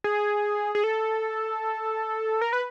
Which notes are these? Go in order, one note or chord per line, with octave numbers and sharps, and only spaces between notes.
G#4
G#4
A4
A#4
B4